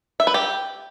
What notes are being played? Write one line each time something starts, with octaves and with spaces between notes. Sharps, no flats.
E5
B4
G4